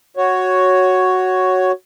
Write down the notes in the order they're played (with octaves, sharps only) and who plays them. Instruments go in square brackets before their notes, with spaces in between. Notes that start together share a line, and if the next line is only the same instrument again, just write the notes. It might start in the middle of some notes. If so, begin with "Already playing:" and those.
[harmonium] F#4 C#5